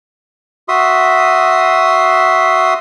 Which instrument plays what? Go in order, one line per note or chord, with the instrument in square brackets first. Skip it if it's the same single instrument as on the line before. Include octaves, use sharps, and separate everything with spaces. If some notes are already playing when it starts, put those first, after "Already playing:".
[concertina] F#4 E5 C6 D#6